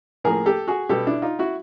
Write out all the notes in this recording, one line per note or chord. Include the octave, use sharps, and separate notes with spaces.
A2 F3 A#3 G#4 A#4
G4 A4
F#4 G#4
B2 G3 B3 G4 A4
D4 E4
D#4 F4
E4 F#4